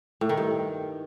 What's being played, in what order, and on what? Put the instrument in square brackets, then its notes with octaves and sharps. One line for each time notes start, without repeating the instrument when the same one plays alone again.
[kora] A2
D#3
G2